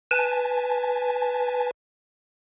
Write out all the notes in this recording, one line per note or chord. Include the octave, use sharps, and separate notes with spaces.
B4 G#5 A5